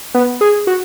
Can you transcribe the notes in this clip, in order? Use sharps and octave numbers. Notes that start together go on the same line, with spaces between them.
B3
G#4
F#4